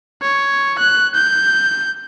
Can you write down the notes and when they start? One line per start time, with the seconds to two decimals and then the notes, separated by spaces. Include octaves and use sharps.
0.22 C#5
0.79 F#6
1.15 G6